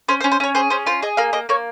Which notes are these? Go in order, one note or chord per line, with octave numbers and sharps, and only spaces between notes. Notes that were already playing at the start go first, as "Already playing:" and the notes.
C#4 C5
C5
C#4
C5
C#4 C#5
G#4 C5
C#4 C5
F4 C5
G#4 D#5
A#3 F5
A#3 D#5
A#3 C#5